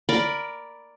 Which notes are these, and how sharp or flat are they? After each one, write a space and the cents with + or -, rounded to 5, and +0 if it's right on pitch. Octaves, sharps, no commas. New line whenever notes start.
A#4 +0 D5 +0 B5 +0